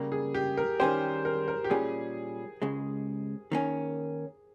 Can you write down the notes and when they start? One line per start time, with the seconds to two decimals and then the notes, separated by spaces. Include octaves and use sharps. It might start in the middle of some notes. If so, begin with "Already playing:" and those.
Already playing: C#3 G3 A#3
0.12 G#4
0.34 G4
0.57 A#4
0.80 D#3 G3 C#4 G4 C5
1.25 A#4
1.48 A#4
1.64 G4
1.70 A#2 G3 C#4 G#4
2.62 C#2 C#3 G#3
3.52 D#3 A#3 C#4